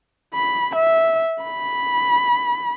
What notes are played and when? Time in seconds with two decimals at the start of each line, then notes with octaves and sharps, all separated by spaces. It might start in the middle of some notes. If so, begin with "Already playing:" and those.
0.34 B5
0.76 E5
1.44 B5